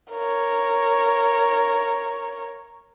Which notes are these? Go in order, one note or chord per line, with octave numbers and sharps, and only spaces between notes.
A#4 C#5